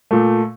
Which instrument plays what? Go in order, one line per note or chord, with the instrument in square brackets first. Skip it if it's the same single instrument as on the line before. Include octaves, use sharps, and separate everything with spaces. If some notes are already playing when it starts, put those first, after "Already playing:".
[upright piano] A#2 A3